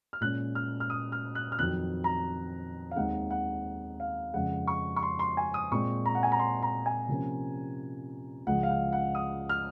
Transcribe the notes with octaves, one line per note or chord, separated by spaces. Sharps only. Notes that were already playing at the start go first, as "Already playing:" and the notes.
F6
A#2 G#3 C#4 F#6
F6
F6
D#6
F6
F#6
F6
F2 D#3 F#3 C4 F#6
A#5
F5
D#2 D#3 G#3 C4 F#5
F#5
F5
F2 C#3 G#3 F#5
C#6
C#6
C6
C6
G#5
D#6
A#2 G#3 C4 C#6
A#5
F#5
G#5
A#5
C6
A#5
G#5
C3 F3 A#3 C#4
C#2 C#3 F3 G#3 F#5
F5
F#5
F#5
D#6
F6